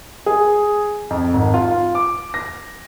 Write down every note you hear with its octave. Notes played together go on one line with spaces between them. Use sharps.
G#4
F2
G#1
F4
D6
A#6